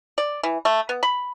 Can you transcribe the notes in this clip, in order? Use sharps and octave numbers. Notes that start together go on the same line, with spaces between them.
D5
E3
A3
B3
B5